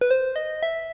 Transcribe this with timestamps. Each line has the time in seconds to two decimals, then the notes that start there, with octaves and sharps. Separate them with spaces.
0.01 B4
0.11 C5
0.36 D#5
0.63 E5